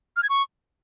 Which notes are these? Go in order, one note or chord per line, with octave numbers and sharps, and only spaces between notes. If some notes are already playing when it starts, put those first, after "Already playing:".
F6
G#6
C#6